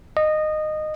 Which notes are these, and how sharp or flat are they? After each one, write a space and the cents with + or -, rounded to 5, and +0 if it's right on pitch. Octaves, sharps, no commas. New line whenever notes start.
D#5 -15